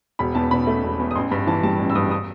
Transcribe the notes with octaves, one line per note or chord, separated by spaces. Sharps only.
E1 B5
E2 A5
B2 B5
A3
E1
E2
D#6
A1 C6
G2 B5
E3 A5
G3 A5
A1
E6
G2 D#6
D#6